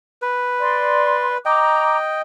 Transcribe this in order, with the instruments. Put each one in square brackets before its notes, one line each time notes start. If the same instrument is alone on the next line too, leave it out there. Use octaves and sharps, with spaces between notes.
[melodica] B4
[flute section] D5 C6
[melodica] D#5 G5 [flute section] A#5 D6